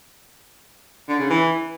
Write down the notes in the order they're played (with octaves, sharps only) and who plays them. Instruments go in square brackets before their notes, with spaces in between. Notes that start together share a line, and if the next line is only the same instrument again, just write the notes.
[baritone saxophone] D3
C#3
E3